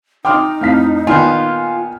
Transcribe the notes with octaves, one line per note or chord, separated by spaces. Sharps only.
D#4 G5 C6 D6 D#6 F6
F2 A2 F5 F6 B6
A#2 D#3 B3 F4 G#5 F6 G6